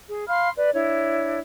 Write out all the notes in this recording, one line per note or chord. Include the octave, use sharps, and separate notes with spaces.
G#4
F5 B5 C6 F6
B4 D5
D4 E4 C#5